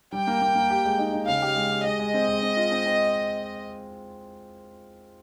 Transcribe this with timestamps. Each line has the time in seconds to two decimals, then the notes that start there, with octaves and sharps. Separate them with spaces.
0.12 G3 G5
0.27 A#3
0.42 A#3
0.55 A#3
0.70 G4
0.85 G#3
0.99 D#4
1.13 D#4
1.28 C#3 F5
1.42 G4
1.56 G#3
1.71 G4
1.85 G#3 D#5
1.99 G#3
2.14 C4
2.29 G#3
2.42 C4
2.57 F4
2.71 C4
2.86 C4